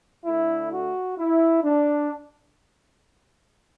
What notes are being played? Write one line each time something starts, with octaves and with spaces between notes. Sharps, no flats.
D3 A3 E4
F#4
E4
D4